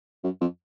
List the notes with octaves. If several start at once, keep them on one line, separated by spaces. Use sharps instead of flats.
F#2
F2